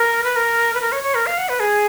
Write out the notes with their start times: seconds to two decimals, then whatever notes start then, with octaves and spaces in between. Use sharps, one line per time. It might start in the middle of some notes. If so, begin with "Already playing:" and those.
Already playing: A#4
0.24 B4
0.36 A#4
0.74 B4
0.81 A#4
0.92 C#5
1.04 C#5
1.15 A#4
1.26 F5
1.38 F#5
1.49 B4
1.60 G#4